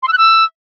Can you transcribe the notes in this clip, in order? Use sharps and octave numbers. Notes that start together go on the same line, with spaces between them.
C6
E6
F#6
E6